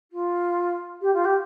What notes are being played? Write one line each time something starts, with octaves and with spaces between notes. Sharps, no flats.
F4
G4
F4
G4